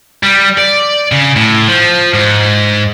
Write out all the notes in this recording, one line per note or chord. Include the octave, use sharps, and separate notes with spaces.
G3
D5
C#3
A2
F3
G#2